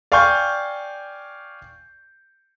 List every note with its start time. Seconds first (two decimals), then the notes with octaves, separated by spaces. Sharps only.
0.12 D5 F5 G5 G#5 C#6 G6